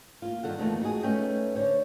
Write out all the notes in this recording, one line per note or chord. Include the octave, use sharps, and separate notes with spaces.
A#3 F4
G2 D#3 A4 F#5
F2 E3 A3 A#3 D#4
G#3 F#4 G#4
A3 C#4 D#4 B4 G5
D3 C5 C#5